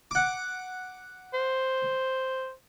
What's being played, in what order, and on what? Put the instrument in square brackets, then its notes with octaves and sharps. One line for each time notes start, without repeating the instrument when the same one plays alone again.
[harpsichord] F#5 D6
[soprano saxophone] C5